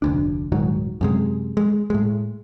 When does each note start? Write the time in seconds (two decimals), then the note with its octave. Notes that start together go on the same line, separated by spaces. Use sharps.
0.02 F1 D2 D4
0.52 D#1 G#2 D#3 F#3
1.01 F#2 C3 G#3
1.57 G#3
1.90 A2 G#3